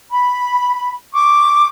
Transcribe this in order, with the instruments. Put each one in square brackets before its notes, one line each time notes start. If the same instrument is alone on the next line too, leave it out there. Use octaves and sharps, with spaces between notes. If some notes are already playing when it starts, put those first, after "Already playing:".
[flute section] B5
C#6 D6